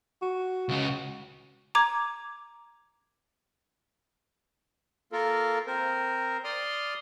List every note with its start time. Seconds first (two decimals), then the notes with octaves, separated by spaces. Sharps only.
0.22 F#4
0.69 C#2 C#3
1.75 A#5 D6 G#6
5.12 A#3 F4 A4 A#4
5.67 C4 A#4 C5
6.44 D5 C6 D#6 F6